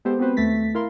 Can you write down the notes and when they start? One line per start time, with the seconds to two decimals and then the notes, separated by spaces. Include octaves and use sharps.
0.05 G#3 B3 G4 A4 C5
0.19 B3 C4 F#4 B4 C5
0.37 D#2 A3 A6 B6
0.74 E4 A#4 F5 C6